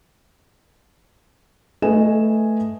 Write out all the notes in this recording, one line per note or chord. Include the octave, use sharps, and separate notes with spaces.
A3 A4 B4 D#5 G#5 E7